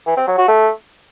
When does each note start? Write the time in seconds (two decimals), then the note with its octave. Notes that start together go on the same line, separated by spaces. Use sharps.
0.06 E3
0.17 C4
0.27 F#3
0.38 F#4
0.48 A3